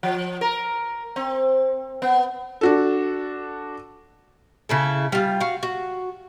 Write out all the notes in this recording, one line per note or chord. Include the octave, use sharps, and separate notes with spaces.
F3
A#4
C4
B3
D4 F#4 A4
C#3 E4 A4
G3 F4
F#4 F5
F#4